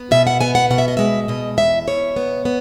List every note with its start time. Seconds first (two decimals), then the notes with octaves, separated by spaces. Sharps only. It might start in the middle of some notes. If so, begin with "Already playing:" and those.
Already playing: B3
0.11 B2 E5
0.27 F#5
0.41 B3 G#5
0.55 F#5
0.70 B2 F#5
0.78 E5
0.88 D#5
0.97 G#3 E5
1.28 B2 D#5
1.58 E2 E5
1.87 B2 C#5
2.16 B3
2.45 B3